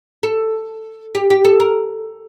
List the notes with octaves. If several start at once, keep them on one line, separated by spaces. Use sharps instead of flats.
A4
G4
G4
A4
A#4